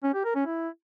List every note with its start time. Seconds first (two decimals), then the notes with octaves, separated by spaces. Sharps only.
0.03 C#4
0.14 G4
0.25 A#4
0.35 C#4
0.46 E4